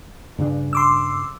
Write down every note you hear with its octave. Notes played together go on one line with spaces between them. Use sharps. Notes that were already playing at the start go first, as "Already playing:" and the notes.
G2 C#3 D4
C6 D6 E6